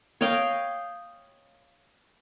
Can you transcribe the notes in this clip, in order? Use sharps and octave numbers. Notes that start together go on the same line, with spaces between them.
C#5 D#5 F5 G5